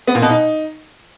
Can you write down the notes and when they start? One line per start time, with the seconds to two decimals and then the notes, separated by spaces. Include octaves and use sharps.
0.07 B3
0.15 A#2
0.22 B2
0.30 D#4